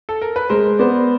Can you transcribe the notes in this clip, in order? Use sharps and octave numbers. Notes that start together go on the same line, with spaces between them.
A4
A#4
B4
G#3 A#4 C5
B3 C5 D5